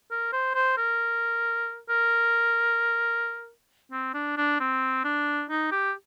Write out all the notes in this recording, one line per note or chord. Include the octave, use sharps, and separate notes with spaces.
A#4
C5
C5
A#4
A#4
C4
D4
D4
C4
D4
D#4
G4